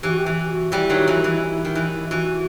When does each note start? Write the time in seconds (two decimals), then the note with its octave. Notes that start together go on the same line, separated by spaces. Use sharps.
0.03 E3 G4
0.10 F#4
0.18 G4
0.26 E3
0.49 F#4
0.72 E3 G3 E4
0.89 D#3 F#3
1.08 E3
1.24 E3
1.65 D#3
1.75 E3
2.11 E3 F#4